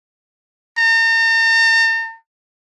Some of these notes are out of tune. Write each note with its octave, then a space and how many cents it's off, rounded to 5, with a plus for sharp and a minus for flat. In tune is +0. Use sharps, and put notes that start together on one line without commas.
A#5 -45